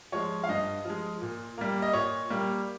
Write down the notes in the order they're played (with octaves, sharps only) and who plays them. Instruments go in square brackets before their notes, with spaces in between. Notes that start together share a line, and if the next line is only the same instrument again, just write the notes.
[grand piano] F3 G#3 C#5
F5
G2 D#5
F3 G#3
A#2
G3 A#3
D#5
A#2 C#5
G3 A#3